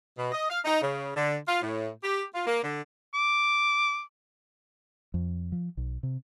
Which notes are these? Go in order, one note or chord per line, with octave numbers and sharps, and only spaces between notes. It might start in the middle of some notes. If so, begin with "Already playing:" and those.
B2
D#5
F5
D#4
C#3
D3
F4
A2
G4
F4
A#3
D3
D6
F2
F3
B1
C3